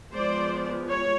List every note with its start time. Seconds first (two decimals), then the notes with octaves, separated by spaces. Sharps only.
0.13 F3 G#3 B3 C5 D5
0.88 C#5